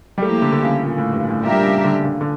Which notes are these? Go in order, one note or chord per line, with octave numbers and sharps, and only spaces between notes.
G3
F3 A3 A#3 E4 G4
D3
D3
C#3
A#2
A2
G2
A2
A#2 G3 D4 G4 A#4 E5
C#3
D3
D3
D3